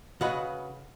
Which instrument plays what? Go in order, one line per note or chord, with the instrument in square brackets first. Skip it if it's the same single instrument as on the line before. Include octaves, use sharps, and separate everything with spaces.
[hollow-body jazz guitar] C#3 F#4 B4 D#5 F#5 B5